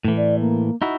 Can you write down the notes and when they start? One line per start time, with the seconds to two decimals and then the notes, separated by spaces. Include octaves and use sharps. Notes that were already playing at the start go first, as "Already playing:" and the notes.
0.05 A2 E3 A3
0.17 D5
0.39 A#3
0.82 D#4 E4 F#4